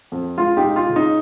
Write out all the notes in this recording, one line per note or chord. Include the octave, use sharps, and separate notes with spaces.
F2
C#2 F4
D#4 G4
C#2
F4
C#3
D#4